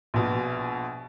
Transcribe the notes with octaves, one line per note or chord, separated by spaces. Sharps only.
A#1 B2